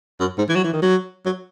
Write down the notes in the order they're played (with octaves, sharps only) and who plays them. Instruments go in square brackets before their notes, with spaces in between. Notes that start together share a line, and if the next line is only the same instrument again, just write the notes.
[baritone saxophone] F#2
G#2
E3
F#3
E3
D#3
F#3
F#3